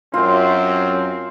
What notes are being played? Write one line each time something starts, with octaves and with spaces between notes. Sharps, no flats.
F#2 C4 F4 F5